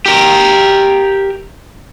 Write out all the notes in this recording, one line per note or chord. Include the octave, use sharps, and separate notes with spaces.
G4 A#4